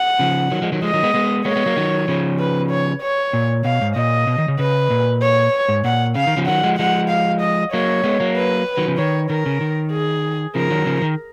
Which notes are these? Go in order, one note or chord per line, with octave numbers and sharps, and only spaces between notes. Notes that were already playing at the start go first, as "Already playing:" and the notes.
Already playing: F#5
C#3 F3
D#3 F#3
F3 G#3
D#3 F#3
F3 G#3 D#5
D#3 F#3
G#3 B3
G#3 B3
G#3 B3 C#5
A#3
G#3 B3
F#3 A#3
D#3 F#3
C#3 F3
B4
C#5
C#5
A#2
B2 F5
G#2
A#2 D#5
B2
D#3
C#3
C#3 B4
A#2
C#5
G#2
A#2 F#5
C#3 F5
D#3
C#3 F3
D#3 F#3 F#5
F3 G#3
F3 G#3 F#5
F5
D#5
F#3 A#3 C#5
G#3 B3
F#3 A#3
B4
D#3 F#3
C#3 F3
D#3 C#5
D#3 A#4
C#3
D#3
G#4
C#3 F3 A#4
D#3 F#3
C#3 F3
D#3